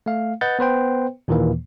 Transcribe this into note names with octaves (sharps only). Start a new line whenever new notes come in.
A3 F5
B4 D#5 F#5 G6 A6
B3 B4 C5 G5
D#2 A#2 D#3 E3 A#3